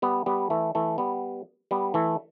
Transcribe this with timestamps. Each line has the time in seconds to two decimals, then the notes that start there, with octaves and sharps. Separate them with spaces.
0.02 G3 B3
0.26 G3 B3
0.50 E3 A3
0.75 E3 A3
0.98 G3 B3
1.71 G3 B3
1.94 E3 A3